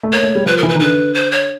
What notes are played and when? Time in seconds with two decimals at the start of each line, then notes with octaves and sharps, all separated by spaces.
0.03 A3
0.12 A#3 C#5
0.23 A3
0.35 G3
0.46 F3 B4
0.58 A#4
0.63 E3
0.69 B4
0.75 D#3
0.80 D3 B4
1.14 C5
1.32 C#5